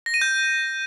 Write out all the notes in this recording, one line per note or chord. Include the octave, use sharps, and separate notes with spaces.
A#6
D#7
G6